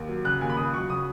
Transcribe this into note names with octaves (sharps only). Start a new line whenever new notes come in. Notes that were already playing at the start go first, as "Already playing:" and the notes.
Already playing: D#2
F#3
C#3 F#6
D#2 G#5
B5
C#2 D#6
F#3 C#6
C#3 D#6